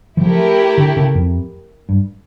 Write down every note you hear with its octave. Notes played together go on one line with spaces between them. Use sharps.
E3
F3 A3 E4 G4 A#4
D3
C#3
F2
G2